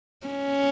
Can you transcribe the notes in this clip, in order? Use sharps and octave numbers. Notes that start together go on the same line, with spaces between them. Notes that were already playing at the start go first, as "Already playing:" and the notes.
C#4